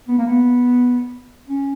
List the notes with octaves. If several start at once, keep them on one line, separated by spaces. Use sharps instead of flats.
B3
A#3
B3
C#4